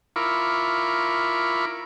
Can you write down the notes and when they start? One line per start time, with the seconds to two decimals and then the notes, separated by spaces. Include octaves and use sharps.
0.16 E4 F4 A#4 B5 C#6 D6